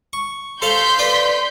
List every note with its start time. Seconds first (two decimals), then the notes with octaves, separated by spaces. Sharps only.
0.13 C#6
0.62 A4 C5 F5 C6 G6 B6
0.99 B4 D5